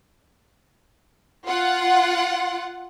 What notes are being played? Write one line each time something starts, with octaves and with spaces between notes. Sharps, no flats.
F4 F#5